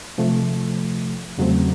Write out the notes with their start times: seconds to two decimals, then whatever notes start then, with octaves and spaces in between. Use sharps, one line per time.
0.18 C3 F3 A3
1.38 E2 C#3 F#3 A3 C4